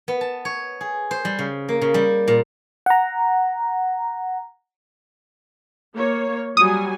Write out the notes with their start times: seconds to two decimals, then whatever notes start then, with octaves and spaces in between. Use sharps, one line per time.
0.08 B3
0.21 A5
0.45 C#5
0.81 G#4
1.11 C5
1.25 G3
1.39 C#3
1.69 A#3
1.81 C#3
1.94 G3
2.28 A#2
2.86 F#5 A#5
5.96 A#3 C#5
6.57 F#3 G3 G#5 D#6